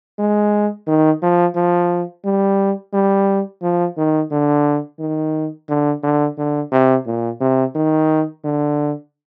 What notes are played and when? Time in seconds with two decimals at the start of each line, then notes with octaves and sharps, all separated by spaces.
0.19 G#3
0.87 D#3
1.22 F3
1.55 F3
2.25 G3
2.93 G3
3.63 F3
3.97 D#3
4.31 D3
4.99 D#3
5.69 D3
6.03 D3
6.37 D3
6.72 C3
7.06 A#2
7.40 C3
7.75 D#3
8.44 D3